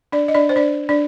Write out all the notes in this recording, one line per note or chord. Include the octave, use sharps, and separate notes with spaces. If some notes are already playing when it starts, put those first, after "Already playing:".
D4 D5
D#5
D4 D5
C5
D4 D5
D4 D5